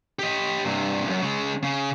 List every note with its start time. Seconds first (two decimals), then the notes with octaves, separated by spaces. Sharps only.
0.19 G4 D#5
0.65 G2 C3
1.06 C2 F#2
1.22 C#3 G#3
1.64 C#3